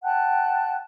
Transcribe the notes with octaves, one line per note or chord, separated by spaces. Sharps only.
F#5 G5 A5 F#6